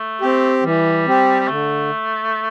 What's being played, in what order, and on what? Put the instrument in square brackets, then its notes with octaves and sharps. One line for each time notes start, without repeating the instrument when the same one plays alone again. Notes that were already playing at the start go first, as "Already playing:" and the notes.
Already playing: [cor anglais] A3
[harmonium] C4 G4
[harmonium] E3 [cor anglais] G3
[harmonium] C4 G4
[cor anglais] G3
[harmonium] D3 [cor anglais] A3